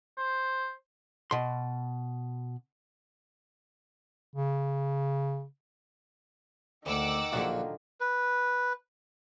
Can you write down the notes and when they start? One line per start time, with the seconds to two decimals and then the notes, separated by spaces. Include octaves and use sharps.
0.18 C5
1.31 B2 C6
4.35 C#3
6.86 D2 D#3 F#5 D6 E6
7.32 A#1 A#2 D3 F#3 F4 F#4
8.01 B4